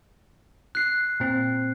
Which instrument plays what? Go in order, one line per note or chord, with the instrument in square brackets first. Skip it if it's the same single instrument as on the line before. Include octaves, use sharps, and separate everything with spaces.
[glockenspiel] F#6 C7
[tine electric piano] A#2 C4